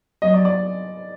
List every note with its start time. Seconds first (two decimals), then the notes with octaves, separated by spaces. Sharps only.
0.22 F#3 D#5
0.34 D5
0.45 D5